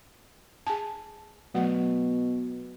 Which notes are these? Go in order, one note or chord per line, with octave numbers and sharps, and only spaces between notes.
G#4 G#5 A5
B2 F#3 A3 F#5